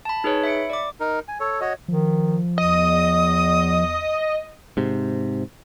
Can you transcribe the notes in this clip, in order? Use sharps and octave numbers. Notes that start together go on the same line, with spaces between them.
A5 B5
D#4 G#4 B4 C#5
E5 B5 C#7 D7
D5 D6
D#4 A#4
G#5
A4 C#5
F#4 C#5 D#5
D#3 F3
E2 D#5 D#6
G#2 C3